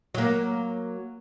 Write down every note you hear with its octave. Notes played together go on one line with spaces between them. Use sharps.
F#3 A#3